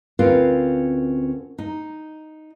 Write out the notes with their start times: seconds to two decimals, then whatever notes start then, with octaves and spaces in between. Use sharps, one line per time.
0.19 D2 C4 C#4 F4 A#4 B4
1.58 D#4